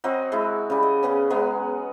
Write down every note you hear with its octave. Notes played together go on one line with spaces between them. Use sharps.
F#3 C4 F#4 D#5
G#3 E4
C#3 G3
D#5
C#3 B3 C#4 G#4
F#3 G#3 B3